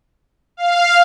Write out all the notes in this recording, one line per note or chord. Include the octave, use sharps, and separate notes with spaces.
F5